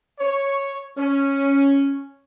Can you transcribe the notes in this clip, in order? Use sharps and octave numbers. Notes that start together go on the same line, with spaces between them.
C#5
C#4